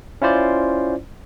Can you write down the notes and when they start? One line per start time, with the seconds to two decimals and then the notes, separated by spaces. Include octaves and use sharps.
0.22 C#4 E4 F4 C5 D5